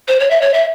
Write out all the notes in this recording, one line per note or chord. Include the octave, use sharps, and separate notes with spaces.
C5
C#5
E5
C#5
E5